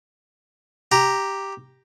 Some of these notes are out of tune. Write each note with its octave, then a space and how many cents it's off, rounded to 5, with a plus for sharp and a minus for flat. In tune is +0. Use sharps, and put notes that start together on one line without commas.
G4 +0 A#5 +0